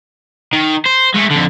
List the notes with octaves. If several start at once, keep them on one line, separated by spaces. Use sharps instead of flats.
D#3
C5
G#3 A3
F2 D3